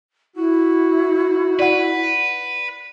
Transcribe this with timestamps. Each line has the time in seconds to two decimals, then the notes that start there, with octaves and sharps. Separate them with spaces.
0.36 E4 F#4
1.59 B4 D5 F#5